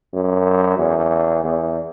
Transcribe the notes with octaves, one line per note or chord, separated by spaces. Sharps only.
F#2
E2
E2